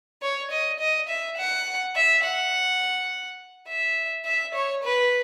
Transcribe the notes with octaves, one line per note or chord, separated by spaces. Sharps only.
C#5
D#5
D#5
E5
F#5
E5
F#5
E5
E5
C#5
B4